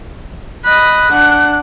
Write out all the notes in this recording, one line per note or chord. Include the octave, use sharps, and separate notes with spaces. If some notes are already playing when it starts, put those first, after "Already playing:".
D#5 B5 F#6
D4 F#5